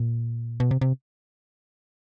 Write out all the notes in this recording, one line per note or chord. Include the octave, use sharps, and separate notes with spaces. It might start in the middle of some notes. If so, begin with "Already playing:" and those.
Already playing: A#2
B2
C3
C3